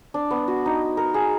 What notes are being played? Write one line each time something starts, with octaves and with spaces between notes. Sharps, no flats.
D4
B3
F#4
D#4
A#4
G#4